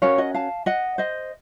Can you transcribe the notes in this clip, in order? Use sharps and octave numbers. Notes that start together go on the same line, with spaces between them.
C#4 F#4 A#4 C#5 F5
D#5 F#5
F5 A5
D#5 F#5
C5 D#5